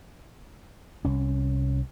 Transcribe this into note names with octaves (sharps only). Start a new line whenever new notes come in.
C2 C#4